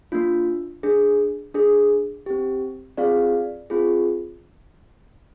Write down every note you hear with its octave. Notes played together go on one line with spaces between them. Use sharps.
A#3 D4 F4
D4 G#4
D4 G#4
C4 G4
C4 F4 G#4 D5 F5
C4 F4 G#4